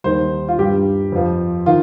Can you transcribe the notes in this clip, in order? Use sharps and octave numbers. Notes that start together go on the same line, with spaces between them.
D#2 D#3 G3 C5
F4
G2 G3 G4
F2 F3
D#3 F4